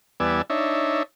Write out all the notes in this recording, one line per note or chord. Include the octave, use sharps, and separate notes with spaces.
E2 G3 B3 D5 G#5 E6
D4 D#4 C#5 E5